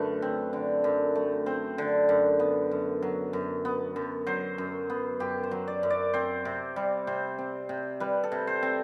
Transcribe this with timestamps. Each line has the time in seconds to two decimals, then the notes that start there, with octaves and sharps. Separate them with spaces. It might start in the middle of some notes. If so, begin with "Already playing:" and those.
Already playing: F#2 D3 A3 B4
0.22 C4
0.53 D3
0.84 F#2
1.15 A3
1.46 C4 C5
1.78 D3
2.09 F#2
2.40 B3
2.71 F#2
3.02 F#3
3.33 F#2
3.65 B3
3.96 F#2
4.27 F#3 C5
4.58 F#2
4.90 B3
5.20 F#2 G4
5.43 C5
5.51 F#3
5.68 D5
5.83 F#2
5.90 D5
6.14 C4 C5
6.45 C3
6.76 G3
7.07 C3 C5
7.38 C4
7.69 C3
8.00 G3 B4
8.24 A4
8.32 C3
8.47 C5
8.63 C4